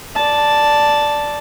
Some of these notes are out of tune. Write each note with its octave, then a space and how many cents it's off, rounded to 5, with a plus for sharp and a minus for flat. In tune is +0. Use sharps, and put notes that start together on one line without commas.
D5 +0 A5 +0